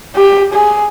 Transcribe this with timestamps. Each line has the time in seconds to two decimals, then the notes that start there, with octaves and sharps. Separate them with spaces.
0.16 G4
0.53 G#4